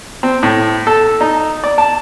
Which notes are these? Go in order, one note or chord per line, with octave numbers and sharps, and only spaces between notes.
C4
A2
A4
D#4
D5
A5